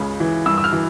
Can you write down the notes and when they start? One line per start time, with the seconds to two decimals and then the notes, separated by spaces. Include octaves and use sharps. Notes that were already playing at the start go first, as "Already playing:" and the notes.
Already playing: C#2 C#3
0.20 E3
0.46 G2 E6
0.58 E6
0.64 F6
0.73 E3